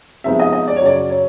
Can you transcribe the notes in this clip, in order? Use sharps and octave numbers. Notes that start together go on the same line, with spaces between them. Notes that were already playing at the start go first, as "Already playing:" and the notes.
C3 F3 G#3 B3 D#4 E5
D#5
D#5
D5
C#5
F#2 C#3 F#3 D5
C#5